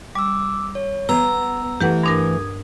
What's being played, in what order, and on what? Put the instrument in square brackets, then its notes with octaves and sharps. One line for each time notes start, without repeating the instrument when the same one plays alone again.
[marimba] G3 [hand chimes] D6 E6
[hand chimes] C#5
[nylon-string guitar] B3 [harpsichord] A#5 [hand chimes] E6
[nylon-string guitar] E3 A3 [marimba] G4 B4 F#5
[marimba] G2 D4 A#4 [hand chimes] D#6 G#6